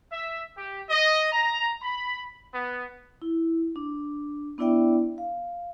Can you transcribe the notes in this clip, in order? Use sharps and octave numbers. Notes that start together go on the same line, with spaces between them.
E5
G4
D#5
A#5
B5
B3
E4
D4
B3 D4 E4 D5 E5 G5
F5